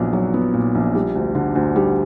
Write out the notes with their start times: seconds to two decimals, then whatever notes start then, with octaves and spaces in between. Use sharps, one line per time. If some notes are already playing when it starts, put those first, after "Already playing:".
Already playing: A#1 A#2 F#3 B3
0.13 F#3
0.34 B3
0.54 A#2
0.75 A#1
0.95 G3
1.15 D2
1.35 D3
1.55 D2
1.76 G3